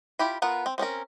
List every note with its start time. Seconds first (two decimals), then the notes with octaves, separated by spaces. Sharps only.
0.19 E4 F4 G4 B5
0.42 B3 F4 A#4 F#5
0.66 C4
0.78 C4 C#4 D#4 A#4